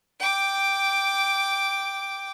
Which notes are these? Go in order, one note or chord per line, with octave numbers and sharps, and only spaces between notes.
G5 D6